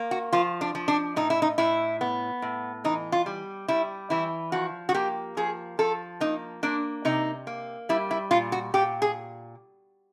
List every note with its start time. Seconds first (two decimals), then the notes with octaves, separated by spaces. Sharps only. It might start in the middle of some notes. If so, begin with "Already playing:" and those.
Already playing: A#3
0.11 F#4
0.32 F3 F4
0.61 D4
0.75 F3
0.88 D4
1.16 A2 D#4
1.30 E4
1.42 D#4
1.58 A2 E4
2.01 B3
2.42 A2
2.84 E3 D#4
3.12 F4
3.26 G3
3.68 G3 E4
4.10 E3 E4
4.52 F3 F#4
4.89 F#4
4.94 A#3 G4
5.37 F3 G#4
5.79 F3 A4
6.20 A#3 D#4
6.63 A#3 D4
7.05 C3 D#4
7.47 A#3
7.89 G3 E4
8.11 E4
8.31 A#2 F4
8.52 F#4
8.74 A#2 G4
9.02 G#4